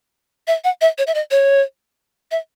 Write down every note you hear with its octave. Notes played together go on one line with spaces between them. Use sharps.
E5
F#5
E5
C#5
E5
D#5
C#5
E5